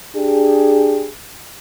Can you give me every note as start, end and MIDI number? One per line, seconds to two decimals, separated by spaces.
0.15 1.09 62
0.15 1.09 67
0.15 1.09 68